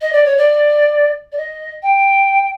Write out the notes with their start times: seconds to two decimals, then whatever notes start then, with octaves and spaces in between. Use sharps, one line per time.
0.01 D#5
0.13 D5
0.25 C#5
0.37 D5
1.32 D5
1.37 D#5
1.83 G5